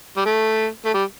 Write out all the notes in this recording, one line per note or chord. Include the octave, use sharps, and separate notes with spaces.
G3
A3
A3
G3